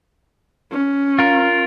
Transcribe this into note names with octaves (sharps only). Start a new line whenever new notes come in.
C#4
F4 A#4